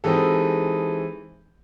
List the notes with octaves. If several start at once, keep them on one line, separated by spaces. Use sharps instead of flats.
E3 G#3 C4 D#4 G4 A4